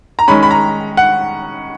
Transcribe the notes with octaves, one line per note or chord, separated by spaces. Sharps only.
A#5
D#3 G#3 C#4 B5
B5
A#5
F#5